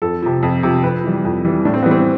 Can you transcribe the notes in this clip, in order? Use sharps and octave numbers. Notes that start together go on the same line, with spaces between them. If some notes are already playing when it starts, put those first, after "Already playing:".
F2 A4
C3 F3
F2
C3 F3
F2 B4
E3 G3
F2
E3 G3
A2 D4
C4
E3 G3 B3
C4